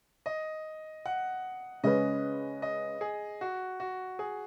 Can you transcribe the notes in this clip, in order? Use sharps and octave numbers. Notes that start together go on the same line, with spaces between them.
D#5
F#5
C#3 G#3 C#4 B4 D#5
D#5
G#4
F#4
F#4
G#4